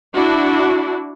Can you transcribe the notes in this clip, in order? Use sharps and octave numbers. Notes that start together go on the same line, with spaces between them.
D4 E4 F#4